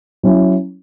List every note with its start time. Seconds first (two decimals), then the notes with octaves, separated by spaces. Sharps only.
0.23 F#3 C#4 E4